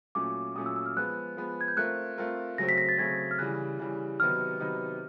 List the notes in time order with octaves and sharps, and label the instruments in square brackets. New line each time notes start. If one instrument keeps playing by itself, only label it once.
[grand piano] A#2 F#3 A3 C#4 [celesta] D6
[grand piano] A#2 F#3 A3 C#4 [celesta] D#6
[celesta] E6
E6
F6
[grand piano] F3 G#3 B3 [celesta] F#6
[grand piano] F3 G#3 B3
[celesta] G#6
G6
[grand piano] A3 C4 F4 A#4 [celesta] F#6
[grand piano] A3 C4 F4 A#4
[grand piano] C#3 F#3 A3 C4 [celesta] A#6
[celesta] B6
A#6
A6
[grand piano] C#3 F#3 A3 C4 [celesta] G#6
[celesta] F6
[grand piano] C#3 E3 G3 [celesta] F#6
[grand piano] C#3 E3 G3
[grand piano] C3 D#3 F#3 B3 D#4 [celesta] F6
[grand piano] C3 D#3 F#3 B3 D#4